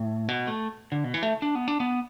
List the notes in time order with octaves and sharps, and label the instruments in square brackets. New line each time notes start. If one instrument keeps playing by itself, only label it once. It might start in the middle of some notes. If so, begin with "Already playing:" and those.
Already playing: [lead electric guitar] A2
B2
A3
D3
B2
E3
A3
D4
B3
D4
B3